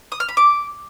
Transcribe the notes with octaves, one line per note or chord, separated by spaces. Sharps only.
D#6
F6
B5
D6